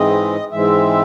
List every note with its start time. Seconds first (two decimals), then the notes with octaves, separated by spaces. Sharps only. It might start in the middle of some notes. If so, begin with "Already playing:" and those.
Already playing: G#2 E3 G#3 C4 D#5
0.52 G#2 E3 G#3 C4 E5